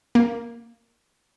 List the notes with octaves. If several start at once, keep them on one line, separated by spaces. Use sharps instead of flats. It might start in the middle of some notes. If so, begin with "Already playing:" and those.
A#3